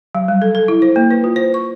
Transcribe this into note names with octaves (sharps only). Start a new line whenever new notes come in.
F#3
G3
A4
A4
E4
C5
A#3
B4
F4
C5
C#6